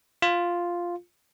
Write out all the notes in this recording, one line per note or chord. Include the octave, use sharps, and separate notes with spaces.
F4